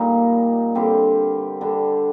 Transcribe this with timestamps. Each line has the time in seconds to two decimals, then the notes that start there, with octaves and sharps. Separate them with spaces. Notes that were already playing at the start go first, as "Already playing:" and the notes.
Already playing: A#2 G3 A#3 D#4
0.75 D3 G3 C4 G4
1.61 D3 G3 D4 A4